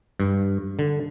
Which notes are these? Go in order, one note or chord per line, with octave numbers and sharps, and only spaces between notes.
G2
D3